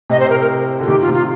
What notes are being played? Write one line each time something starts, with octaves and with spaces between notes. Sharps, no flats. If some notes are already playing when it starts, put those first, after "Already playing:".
A2 C3 D#5
C5
A#4
A#4
D3
F4
C3 D#3 G4
F4
A2 C3
F4